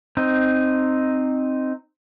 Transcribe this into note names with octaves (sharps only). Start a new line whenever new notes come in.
C4 D#4